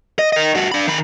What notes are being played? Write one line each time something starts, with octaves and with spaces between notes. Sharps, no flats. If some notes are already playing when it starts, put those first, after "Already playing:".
D#5
A#4 D#5
G2 F#4
D4 B5
D#3 B5